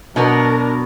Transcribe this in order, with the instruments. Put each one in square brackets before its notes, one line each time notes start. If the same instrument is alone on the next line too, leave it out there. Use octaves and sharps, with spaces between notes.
[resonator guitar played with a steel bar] B2 F#3 B3 [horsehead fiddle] D4 A#4